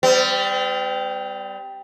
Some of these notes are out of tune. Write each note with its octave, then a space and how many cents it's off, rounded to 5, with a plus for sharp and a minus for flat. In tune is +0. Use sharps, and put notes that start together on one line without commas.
G3 +0 C4 -45